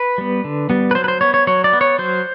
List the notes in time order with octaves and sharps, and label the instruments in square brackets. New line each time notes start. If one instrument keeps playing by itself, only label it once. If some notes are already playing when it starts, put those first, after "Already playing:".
Already playing: [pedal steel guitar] B4
G3 B3
D3
G3 B3
B4
F#3 C5
B4
C5
B3 C#5
C#5
F#3 C#5
D5
B3
C#5
F#3 C5